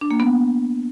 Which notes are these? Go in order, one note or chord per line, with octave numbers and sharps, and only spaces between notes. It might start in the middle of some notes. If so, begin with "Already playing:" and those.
D4
A#3
B3